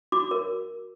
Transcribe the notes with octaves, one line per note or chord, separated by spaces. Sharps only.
F#4 D6
A#4